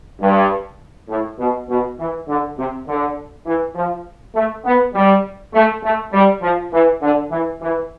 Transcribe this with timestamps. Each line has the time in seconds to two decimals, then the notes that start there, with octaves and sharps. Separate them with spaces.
0.21 G2
1.09 A2
1.39 B2
1.69 B2
1.99 E3
2.28 D3
2.58 C3
2.87 D3
3.46 E3
3.75 F3
4.35 A3
4.65 B3
4.94 G3
5.54 A3
5.84 A3
6.13 G3
6.42 F3
6.72 E3
7.02 D3
7.31 E3
7.61 E3